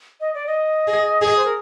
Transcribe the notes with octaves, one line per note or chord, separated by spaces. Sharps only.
D#5
D5
D#5
G#4
G#4
C5
A#4